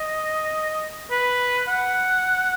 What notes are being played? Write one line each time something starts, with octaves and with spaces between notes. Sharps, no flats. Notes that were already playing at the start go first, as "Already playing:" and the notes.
Already playing: D#5
B4
F#5